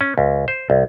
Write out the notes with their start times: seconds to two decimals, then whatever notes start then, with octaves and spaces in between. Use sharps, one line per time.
0.01 C#4
0.18 C#2
0.48 C5
0.70 C2